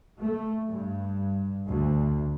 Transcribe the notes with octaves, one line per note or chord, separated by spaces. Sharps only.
A3
G2
D2